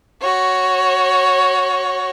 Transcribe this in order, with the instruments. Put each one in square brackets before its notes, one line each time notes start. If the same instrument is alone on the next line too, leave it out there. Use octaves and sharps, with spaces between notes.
[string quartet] F#4 C#5